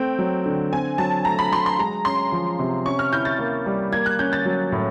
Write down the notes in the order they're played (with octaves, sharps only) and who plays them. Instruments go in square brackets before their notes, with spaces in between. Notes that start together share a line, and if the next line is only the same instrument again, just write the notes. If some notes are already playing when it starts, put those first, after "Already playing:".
Already playing: [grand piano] A3 C4 [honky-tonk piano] G5
[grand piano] F#3
D3
[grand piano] C4 [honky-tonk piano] G#5
[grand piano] F#3 [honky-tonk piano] A5
[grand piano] A3 [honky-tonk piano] A#5
[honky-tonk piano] B5
[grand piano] F#3 [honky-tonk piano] C6
[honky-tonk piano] C6
[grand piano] G#3 [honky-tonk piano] A#5
[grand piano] C#4 [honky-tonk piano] C6
[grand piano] F3
C3
[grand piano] C#4 [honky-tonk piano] C#6
[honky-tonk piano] F6
[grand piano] E4 [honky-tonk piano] G6
[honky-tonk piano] A6
[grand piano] A#3
G3
[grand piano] A#3 [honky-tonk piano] G#6
[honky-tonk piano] F#6
[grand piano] C#4 [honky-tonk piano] G6
[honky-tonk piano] A6
[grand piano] F#3
A2